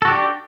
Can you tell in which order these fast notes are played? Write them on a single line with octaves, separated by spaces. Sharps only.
A4 F#4 G4 D4